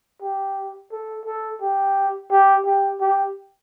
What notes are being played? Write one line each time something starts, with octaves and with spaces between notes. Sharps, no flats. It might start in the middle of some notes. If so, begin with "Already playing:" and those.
G4
A4
A4
G4
G4
G4
G4